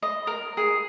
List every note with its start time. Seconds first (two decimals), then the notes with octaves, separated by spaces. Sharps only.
0.02 D#5
0.27 A#4
0.57 G#4